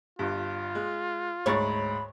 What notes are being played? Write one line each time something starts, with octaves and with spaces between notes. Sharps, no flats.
G1 G2 F4
G#3
D2 G#2 C#5 B5 A6